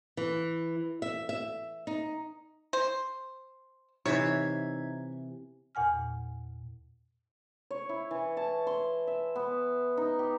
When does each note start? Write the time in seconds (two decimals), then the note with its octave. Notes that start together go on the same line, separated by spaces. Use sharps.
0.17 E3
1.02 E5
1.29 E5
1.87 D#4
2.73 C5
4.06 C3 E3 D#4 C#5 E5 G#6
5.75 E2 A#2 F#5 G#5 F6
7.71 C#5
7.89 E4
8.11 E3
8.37 A5
8.67 C6
9.07 E5
9.36 B3
9.97 D#4
10.19 G4